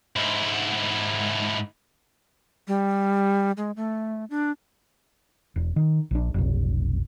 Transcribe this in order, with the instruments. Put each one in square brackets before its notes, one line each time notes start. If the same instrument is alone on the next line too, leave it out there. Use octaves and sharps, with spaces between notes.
[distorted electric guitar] G#2 E4
[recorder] G3
G#3
A3
D4
[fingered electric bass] E1
D#3
A#1 D4
F1 B1